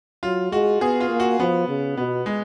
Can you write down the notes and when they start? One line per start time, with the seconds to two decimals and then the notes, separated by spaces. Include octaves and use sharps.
0.23 F#3 F4
0.52 G#3 F#4
0.81 B3 G#4
1.00 F4
1.10 A#3
1.20 F#4
1.39 F3 B3
1.68 C#3
1.97 B2 B3
2.26 G#3